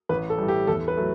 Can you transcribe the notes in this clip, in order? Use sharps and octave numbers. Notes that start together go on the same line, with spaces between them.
A1 B4
A4
A2 G3
G4
E2 A4
B4
F#3 A3